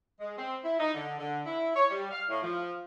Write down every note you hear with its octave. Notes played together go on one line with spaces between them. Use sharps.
G#3
C4
E4
D#4
D3
D3
E4
C#5
G3
F5
A2
F3